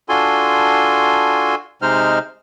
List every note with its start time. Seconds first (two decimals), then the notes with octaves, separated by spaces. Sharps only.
0.09 D4 F4 F#4 A4 G#5 C6
1.82 C3 G#3 D#4 C5 F6